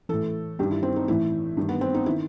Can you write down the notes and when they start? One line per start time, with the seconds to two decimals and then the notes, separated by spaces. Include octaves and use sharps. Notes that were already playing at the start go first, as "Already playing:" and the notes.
0.09 A2 E3 A4
0.59 G2 D#3 G4
0.71 E4
0.83 C4
0.96 D#4
1.08 A2 E3 E4
1.57 G2 D#3
1.69 B3
1.81 C4
1.94 D#4
2.06 E4
2.09 D#3